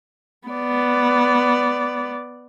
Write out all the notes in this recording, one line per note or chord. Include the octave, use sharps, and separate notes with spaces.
B3 D5